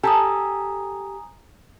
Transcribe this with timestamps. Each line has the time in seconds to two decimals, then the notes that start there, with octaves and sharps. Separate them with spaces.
0.04 G4 A4 G#5 A#5 D#6